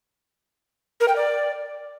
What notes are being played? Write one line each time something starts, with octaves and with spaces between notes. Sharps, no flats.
A#4
G5
D5